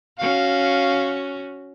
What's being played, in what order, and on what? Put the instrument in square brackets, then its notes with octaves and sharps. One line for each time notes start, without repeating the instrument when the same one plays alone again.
[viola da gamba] C#4 F#4 [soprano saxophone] F5